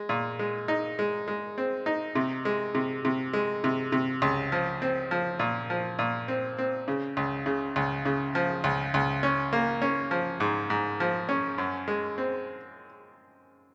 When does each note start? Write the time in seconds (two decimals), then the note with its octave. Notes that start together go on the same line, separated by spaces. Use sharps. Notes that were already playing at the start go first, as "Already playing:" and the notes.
Already playing: G#3
0.09 A#2
0.39 G#3
0.68 D#4
0.99 G#3
1.28 G#3
1.58 C4
1.86 D#4
2.15 C3
2.45 G#3
2.75 C3
3.05 C3
3.33 G#3
3.64 C3
3.92 C3
4.22 C#2
4.52 F3
4.82 C4
5.11 F3
5.39 A#2
5.70 F3
5.99 A#2
6.28 C4
6.58 C4
6.88 C#3
7.17 C#2
7.46 C#3
7.76 C#2
8.05 C#3
8.35 F3
8.64 C#2
8.94 C#2
9.23 C#4
9.53 A#3
9.82 C#4
10.11 F3
10.40 G#2
10.70 G#2
11.00 F3
11.29 C#4
11.58 F#2
11.88 G#3
12.18 C4